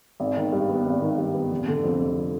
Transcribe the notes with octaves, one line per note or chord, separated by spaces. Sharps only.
G#1
D#3
G2
B3
G#1
D#3
G2
B3
F1
D3
F2
F1